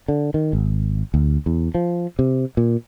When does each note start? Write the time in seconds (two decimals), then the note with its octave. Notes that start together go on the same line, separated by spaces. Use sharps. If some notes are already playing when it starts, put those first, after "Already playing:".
0.08 D3
0.34 D#3
0.53 G#1
1.14 D2
1.46 E2
1.75 F3
2.19 C3
2.57 A#2